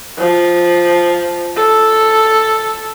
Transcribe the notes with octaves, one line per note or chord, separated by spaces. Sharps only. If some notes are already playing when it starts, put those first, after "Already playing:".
F3
A4